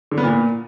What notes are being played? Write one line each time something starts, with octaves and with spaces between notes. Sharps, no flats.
D3
B3
A#2